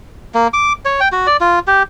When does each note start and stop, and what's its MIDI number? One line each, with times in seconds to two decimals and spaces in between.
0.34 0.48 58
0.53 0.73 86
0.85 1.00 73
1.00 1.08 79
1.12 1.27 66
1.27 1.37 74
1.41 1.59 65
1.67 1.83 67